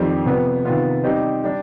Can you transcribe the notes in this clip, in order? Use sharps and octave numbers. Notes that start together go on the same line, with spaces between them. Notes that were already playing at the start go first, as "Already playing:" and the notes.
Already playing: F2 D#3 G3 C4 G4
C3 F3 B3
C3 D#3 B3 F4
G3 C4 D#4 G4 C5
G3 D4